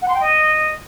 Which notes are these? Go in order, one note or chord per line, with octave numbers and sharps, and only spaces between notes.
F#5
C6
G5
D#5